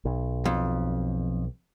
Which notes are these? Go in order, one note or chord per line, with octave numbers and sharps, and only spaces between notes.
B1
F2